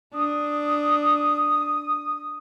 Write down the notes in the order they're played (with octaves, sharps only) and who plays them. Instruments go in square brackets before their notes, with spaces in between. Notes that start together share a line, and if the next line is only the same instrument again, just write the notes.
[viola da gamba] D4 [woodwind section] D#6